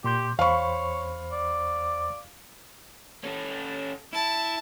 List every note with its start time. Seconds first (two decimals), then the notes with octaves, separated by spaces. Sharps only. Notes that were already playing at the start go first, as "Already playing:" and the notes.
0.04 A#2 G4 C6 G6
0.39 E2 C5 C#5 F5 B5 C#6
1.32 D5
3.24 C#4 A4
4.13 E4 A5